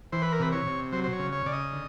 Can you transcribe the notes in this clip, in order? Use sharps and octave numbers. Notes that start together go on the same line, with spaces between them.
E3 C5
B4
A#4
C3 B4
C#5
C3
F#3 C5
C5
C#5
C#3
C#5
C#3 D5
D#5
D3